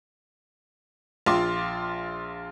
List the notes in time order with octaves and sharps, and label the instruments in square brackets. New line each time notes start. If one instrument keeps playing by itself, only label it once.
[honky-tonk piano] A#1 F4 C6 D6